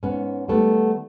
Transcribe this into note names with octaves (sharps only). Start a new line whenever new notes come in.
G#2 B3 C#4
D#3 G3 A3 B3